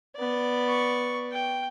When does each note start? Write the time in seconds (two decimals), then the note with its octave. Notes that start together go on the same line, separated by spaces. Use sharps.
0.17 B3 D5
0.68 C#6
1.32 G5